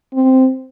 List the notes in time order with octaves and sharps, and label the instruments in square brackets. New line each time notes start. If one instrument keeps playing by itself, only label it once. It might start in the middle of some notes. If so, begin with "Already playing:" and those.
[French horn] C4